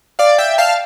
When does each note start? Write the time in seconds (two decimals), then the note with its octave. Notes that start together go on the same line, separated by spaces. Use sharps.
0.19 D5 F5
0.38 E5 G5
0.58 F5 A5